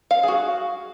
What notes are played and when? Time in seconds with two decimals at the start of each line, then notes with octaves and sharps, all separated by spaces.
0.11 F5
0.23 G#4
0.28 F#4